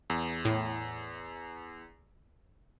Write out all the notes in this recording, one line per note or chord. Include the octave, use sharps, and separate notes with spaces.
E2
A2